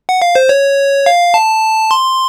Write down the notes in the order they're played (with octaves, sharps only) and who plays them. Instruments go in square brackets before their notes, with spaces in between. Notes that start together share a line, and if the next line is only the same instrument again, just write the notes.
[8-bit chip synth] F#5
F5
C5
C#5
F5
A5
C6